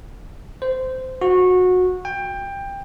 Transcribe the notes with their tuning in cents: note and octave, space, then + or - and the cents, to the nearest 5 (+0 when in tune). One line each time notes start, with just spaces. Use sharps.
C5 -15
F#4 -20
G5 +20